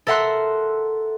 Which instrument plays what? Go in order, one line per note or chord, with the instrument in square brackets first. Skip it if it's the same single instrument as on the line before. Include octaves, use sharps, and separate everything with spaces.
[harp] A4 A#4 E5 F#5 C6 F#6